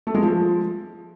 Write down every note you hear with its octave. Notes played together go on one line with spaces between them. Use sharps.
A3
G#3
F3